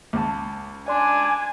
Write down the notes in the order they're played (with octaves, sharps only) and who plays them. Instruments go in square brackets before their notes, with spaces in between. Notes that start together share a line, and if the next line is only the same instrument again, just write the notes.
[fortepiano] C#2 A5
[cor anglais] D4 [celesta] D5 C6 [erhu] G#5